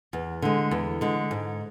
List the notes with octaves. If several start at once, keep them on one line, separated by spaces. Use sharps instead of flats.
E2
D3 G#3
E2
D3 G#3
G#2